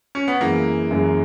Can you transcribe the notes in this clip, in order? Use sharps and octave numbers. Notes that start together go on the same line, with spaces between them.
C#4
B3
F#2 E3 G#3 A#3
F#2 E3 G#3